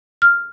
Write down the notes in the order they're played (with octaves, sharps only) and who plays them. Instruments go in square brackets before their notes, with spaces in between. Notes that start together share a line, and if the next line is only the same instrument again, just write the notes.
[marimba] F6